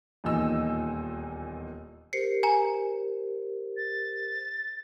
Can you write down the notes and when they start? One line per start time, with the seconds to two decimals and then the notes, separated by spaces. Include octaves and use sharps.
0.24 D#1 E2 A#2 D#4 E6
2.13 G4 A#4 C5 C7 C#7
2.43 G#5 A#5
3.77 A6